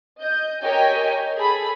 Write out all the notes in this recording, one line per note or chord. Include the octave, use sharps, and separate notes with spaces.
D#5 G6
G4 A#4 C#5 D#5 G5 G#5
G#4 A4 B5